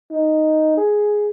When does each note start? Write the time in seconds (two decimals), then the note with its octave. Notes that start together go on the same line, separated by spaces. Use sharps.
0.11 D#4
0.77 G#4